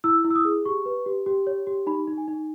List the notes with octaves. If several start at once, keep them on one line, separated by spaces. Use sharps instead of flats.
E4 E6
E4
E6
D#6
G#4
G4 C#6
B4
G4
G4
C#5
G4
D#4 B5
D#4
G#5
D#4